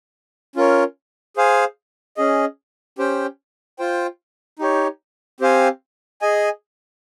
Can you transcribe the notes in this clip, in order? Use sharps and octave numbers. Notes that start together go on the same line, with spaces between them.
C#4 F4 A#4 C#5
G#4 C5 F5 G#5
C#4 G#4 D#5
C#4 G4 C5 G5
F4 C5 G5
D#4 G4 C#5
C4 G4 C5 F5 G#5
G#4 D#5 G#5